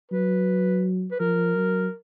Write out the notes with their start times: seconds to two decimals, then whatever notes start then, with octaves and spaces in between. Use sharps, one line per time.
0.12 F#3 B4
1.11 B4
1.19 F3 A#4
1.55 F#3